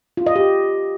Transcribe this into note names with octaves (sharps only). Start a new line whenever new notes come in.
F4
D#5
G4